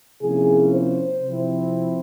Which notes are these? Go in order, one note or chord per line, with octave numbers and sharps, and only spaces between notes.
C3 F3 A#3 C#4 E4 G#4
C5
C3 F3 C4 E4